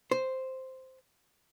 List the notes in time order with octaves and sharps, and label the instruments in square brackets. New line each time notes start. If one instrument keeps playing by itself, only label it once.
[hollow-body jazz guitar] C5